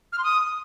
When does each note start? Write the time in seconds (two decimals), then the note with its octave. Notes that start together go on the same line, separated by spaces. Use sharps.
0.13 F6
0.18 C6
0.24 D#6